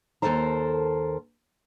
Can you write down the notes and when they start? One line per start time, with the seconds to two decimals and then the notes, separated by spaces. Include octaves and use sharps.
0.22 D#2 A#2 A4 A#4 C5 A#5